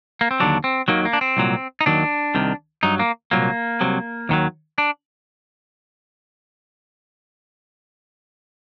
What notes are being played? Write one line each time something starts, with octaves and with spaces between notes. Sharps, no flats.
A#3
C4
D#2 D3 F#3 D4
C4
D#2 D#3 F#3 A#3
A#3
D4
C4
C2 A#2 F#3
D#4
D#2 D#3 F#3 D4
C2 C3 D#3
G2 F#3 D#4
A#3
C2 A#2 F#3 A#3
C2 C3 F#3
D#2 D#3 F#3
D4